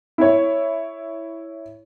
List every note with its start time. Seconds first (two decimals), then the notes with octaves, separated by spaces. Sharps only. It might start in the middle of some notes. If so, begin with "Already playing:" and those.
0.18 E4 C#5